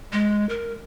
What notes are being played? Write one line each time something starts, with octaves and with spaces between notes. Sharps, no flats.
G#3
A#4